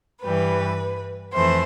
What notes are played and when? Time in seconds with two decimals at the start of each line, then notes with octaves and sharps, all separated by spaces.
0.23 G2 E3 G3 B4
1.34 F2 E3 A3 C5